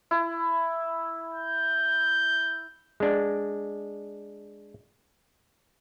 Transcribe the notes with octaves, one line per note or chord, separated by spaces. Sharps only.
E4
G6
G#3 D4